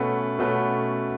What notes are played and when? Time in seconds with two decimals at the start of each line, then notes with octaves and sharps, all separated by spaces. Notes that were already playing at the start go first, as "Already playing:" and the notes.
Already playing: B2 A3 C#4 F#4 B4
0.39 B2 A3 C#4 F#4 B4